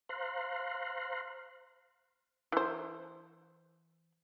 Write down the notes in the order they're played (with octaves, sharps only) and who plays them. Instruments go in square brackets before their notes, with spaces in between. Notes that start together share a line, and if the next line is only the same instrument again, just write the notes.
[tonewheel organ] C5 F5 A#5 C6 F#6
[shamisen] E3 C5